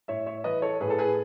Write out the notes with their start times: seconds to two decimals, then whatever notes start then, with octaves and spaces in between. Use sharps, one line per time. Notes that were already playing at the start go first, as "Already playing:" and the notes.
0.08 A2 C#5 E5
0.26 C#5 E5
0.44 E3 B4 D#5
0.62 A4 C#5
0.81 A2 G#4 B4
0.90 A4
0.99 G#4 B4